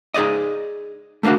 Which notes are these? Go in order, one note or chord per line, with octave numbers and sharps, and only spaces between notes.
D#4 G#4 C5 D5 D#5
A3 A#3 C#4 D4 F#4